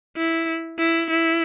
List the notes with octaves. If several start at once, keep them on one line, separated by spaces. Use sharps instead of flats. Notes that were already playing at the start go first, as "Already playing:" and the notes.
E4
E4
E4